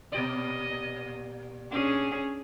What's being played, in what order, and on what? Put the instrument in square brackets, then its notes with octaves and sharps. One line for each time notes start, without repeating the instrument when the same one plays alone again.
[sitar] A#2 G4 D5 [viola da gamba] D#5
[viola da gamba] C#4 D4 G#4